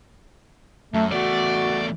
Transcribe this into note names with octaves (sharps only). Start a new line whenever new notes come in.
F#2 A3
E2 A3 F#4 D5